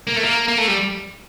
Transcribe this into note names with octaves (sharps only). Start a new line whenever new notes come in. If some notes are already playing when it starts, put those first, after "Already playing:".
A#3
A3
A#3
A#3
A3
G3